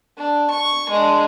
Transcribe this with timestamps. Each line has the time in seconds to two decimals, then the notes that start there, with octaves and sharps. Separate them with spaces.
0.17 D4
0.50 C#6
0.90 G#3 D4